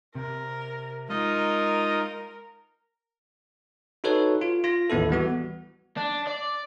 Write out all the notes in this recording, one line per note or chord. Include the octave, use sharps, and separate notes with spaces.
C3 A#4
G#3 D#4 F4 A#4 D#5
D#4 F#4 A4 B4 C#5
F4
F4 A#6
A1 D#2 B3 E4 A4
E3 G3 B3 F#4
D4
D5